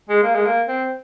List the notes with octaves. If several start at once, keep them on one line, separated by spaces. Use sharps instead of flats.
G#3
A#3
G#3
A#3
C4